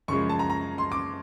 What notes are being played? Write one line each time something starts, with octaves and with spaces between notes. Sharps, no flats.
F#2 C#3 F3 G#3 C#6
A5
A#5
A#5
C6
D6